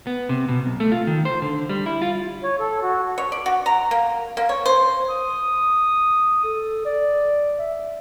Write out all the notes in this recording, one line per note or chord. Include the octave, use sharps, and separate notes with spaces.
B3
C3
B2
B1
A3
F4
D#3
C5
D3
G3
E4
F4
C#5
A4
F#4
C#5
D5
F#4
A#5
A#3
A#3
C#5
C5
D#6
A4
D5
E5